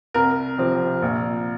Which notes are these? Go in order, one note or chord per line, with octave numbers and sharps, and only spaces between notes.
C2 A#4
C3 F3 C4
A#1